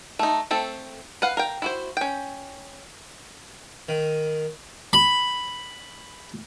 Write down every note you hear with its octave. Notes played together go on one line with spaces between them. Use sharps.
A3 D#4
A3 C4 A4
B4 F5 F#5
A#4 F5 G5
E4 F#4 C5
C#4 G5
D#3
B5